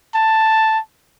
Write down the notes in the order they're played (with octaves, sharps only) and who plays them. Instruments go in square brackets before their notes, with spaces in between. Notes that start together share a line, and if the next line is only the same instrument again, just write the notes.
[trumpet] A5